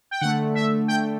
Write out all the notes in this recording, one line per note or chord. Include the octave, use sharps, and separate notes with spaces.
G5
D3 A3 F#5
E5
G5